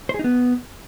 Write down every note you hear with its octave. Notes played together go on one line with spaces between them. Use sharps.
C5
G#4
D#4
B3